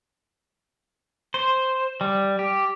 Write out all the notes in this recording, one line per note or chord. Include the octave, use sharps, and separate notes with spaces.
C5
G3
G4